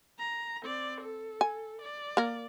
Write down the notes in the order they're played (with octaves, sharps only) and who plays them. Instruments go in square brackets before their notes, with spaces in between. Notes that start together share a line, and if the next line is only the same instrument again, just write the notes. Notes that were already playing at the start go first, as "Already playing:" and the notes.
[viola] A#5
C4 D5
A4
[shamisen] G#5
[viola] D5
[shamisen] A#3 A#4